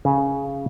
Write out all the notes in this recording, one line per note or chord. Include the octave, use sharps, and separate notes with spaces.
C#3